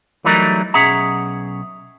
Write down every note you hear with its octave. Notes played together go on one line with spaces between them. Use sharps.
E3 F#3 G3 A3 D#4 A#4
B1 C#4 G#4 E5 F#5 A#5